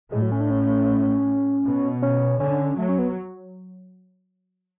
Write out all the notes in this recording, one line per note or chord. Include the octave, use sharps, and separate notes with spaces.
A2 G#3
F#3
C#4
D4
C#4
B2
C#4
D3 C#4
F#3 A3
C#4
B3